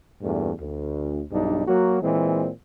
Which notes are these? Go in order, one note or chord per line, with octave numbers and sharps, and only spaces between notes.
E2 G2 A#2 A3
D2
B1 G2 D4 D#4
F#3 A#3 F#4
A#2 E3 G#3 C4